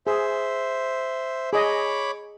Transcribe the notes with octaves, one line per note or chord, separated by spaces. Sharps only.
G#4 C5 E5
G#4 C#5 D#5 B5 D6